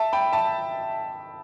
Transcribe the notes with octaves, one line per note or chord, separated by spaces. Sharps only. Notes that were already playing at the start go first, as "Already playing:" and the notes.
Already playing: E5 A5
G5 B5
E5 A5